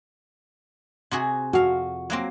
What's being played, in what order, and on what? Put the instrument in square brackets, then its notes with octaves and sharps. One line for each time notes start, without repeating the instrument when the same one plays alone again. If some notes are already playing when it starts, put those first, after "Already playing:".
[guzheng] C3 F#4 G#4
[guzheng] F2 F5 [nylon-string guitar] F#4
[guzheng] F#3 A#3 C4